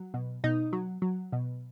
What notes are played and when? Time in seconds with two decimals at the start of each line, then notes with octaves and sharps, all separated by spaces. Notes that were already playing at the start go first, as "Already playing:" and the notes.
Already playing: F#3
0.14 B2
0.44 B2 D#4
0.73 F#3
1.02 F#3
1.33 B2